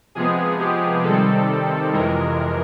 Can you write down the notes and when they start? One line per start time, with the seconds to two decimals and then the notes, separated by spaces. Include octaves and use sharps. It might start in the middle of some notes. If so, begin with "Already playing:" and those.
0.15 C3 F3 G#3 B3 G#4
0.60 G4
1.04 C3 D#3 G3 C4 A4
1.93 F2 C3 E3 G#3 A#4